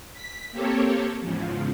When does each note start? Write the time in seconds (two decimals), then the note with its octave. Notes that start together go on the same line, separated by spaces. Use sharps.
0.14 B6
0.51 A#3 C4 G4 A4 C#5
1.20 E2 G#2 C#3 F3